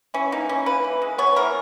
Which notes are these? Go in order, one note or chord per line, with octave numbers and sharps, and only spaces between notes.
E3 C#4
A#3 D#4
E3 C#4
A#3 B4
E3
G#3
B3 C#5
E3 A#4